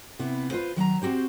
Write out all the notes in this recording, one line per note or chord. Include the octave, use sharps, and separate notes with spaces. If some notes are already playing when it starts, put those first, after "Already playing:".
C3 B3 E4
F4 B4 C5
D#3 F#3 A5 A#5
C4 F#4 G4 C5